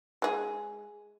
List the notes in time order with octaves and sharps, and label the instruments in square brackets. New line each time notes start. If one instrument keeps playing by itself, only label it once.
[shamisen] G#3 G#4